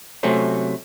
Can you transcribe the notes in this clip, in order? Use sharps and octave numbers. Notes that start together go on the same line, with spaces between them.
C3 F#3 A3 C4 C#4